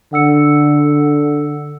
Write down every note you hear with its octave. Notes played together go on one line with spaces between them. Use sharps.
D3 F#5 E6 C#7